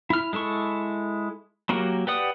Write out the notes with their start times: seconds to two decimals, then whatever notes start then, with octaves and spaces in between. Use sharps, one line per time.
0.10 E4 F6
0.33 G#3 E4 A4 C#6
1.69 F#3 A#3 F#4 G4 A#4
2.07 G4 B4 D5 F#5 D#6